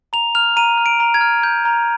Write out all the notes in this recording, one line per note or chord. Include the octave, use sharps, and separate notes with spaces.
A#5 F7
F6 F7
A#5 D#7
F6
D7
A#5
G#6
F6
G6
A#5